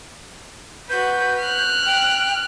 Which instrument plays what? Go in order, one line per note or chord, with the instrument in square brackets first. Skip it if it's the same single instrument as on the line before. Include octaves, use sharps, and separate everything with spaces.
[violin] F#4 B4 [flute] G6
[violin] F6 F#6
[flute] G5